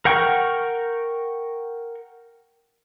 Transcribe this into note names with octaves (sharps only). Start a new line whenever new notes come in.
A#4 F#5 G5 C#6